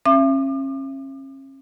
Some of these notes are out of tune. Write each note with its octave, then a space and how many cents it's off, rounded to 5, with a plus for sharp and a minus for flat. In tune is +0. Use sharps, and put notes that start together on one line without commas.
C#4 -40 E5 +35 D6 +40